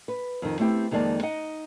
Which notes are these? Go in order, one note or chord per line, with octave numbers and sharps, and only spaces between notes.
B4
F2 D#3
A3 B3 C4 E4 G4
F2 D#3 G#3 A#3 D5 A5
D#4 D#5 F#5